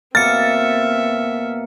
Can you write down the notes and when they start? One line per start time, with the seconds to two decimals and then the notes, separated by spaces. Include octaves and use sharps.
0.15 B2 A#3 C4 E5 F6 A6 C#7